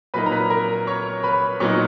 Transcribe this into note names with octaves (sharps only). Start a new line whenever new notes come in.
A#2 F#3 A#3 D#4 B4 B5
A#5
B4 B5
A#4 A#5
C#5 C#6
B4 B5
A#2 F#3 B3 D#4 C#5 C#6